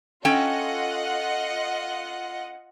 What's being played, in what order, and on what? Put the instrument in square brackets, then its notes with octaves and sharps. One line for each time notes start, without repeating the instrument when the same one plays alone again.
[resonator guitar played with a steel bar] C#4 A4 G5 [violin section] F4 D#5 F#5